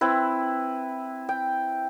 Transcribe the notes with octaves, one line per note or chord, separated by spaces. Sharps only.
C4 E4 B4
G5